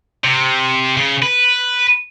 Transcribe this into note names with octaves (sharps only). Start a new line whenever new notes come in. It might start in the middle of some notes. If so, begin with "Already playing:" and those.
C3
C#3
B4